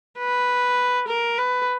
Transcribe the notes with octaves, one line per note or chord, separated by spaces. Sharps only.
B4
A#4
B4